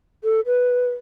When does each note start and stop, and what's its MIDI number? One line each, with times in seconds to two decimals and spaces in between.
0.24 0.40 69
0.46 0.89 71